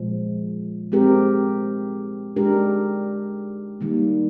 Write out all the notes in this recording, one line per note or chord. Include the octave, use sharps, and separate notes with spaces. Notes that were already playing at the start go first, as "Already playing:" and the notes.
Already playing: A#2 F3 G#3
G#3 C4 G4 A#4
G#3 D4 G4 A#4
D#3 G3 A#3